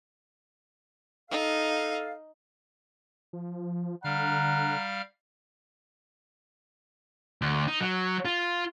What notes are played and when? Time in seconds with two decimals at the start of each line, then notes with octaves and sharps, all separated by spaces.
1.31 D#4 A4 F5
3.33 F3
4.04 D3 G3 F5 F#5 A#5 F6
7.42 D2
7.68 D#4
7.81 F#3
8.25 F4